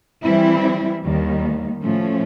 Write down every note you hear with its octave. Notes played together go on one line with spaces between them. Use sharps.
E3 G3 C4 E4
D#2 D#3 G3
A2 F3 A3 C#4